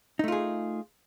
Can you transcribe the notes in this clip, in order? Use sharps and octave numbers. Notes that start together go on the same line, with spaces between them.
A3 D#4 F4 G#4